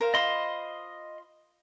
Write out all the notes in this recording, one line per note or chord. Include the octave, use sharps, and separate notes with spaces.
A#4 C5 F5
F4 C5 D#5 B5 C6